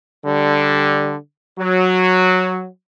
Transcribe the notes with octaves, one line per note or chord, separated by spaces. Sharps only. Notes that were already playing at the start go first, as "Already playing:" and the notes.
D3 G3
F#3